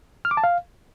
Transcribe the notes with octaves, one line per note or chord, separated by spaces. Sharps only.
F6
D6
A5
F5